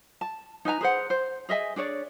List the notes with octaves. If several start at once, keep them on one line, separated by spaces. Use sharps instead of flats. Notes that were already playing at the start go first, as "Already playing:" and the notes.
A5
D#4 B4 G#5 A#5
G#4 B4 C5 F#5
C5
G#4 D#5 E5 G#5
D4 G#4 C#5 D5